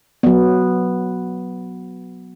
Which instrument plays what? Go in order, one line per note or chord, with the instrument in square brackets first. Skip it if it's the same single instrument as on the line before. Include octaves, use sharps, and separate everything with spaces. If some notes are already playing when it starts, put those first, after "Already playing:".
[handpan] F#3 B3